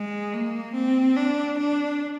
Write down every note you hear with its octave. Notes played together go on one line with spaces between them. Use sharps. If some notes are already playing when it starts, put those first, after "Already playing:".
Already playing: G#3
A#3
C4
D4
D4